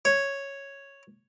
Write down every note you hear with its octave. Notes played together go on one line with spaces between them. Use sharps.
C#5